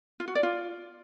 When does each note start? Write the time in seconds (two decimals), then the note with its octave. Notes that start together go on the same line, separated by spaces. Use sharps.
0.20 F4
0.28 F#4
0.35 D5
0.43 F4